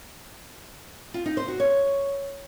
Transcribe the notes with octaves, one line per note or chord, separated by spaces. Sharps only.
F4
D#4
C5
F#4
C#5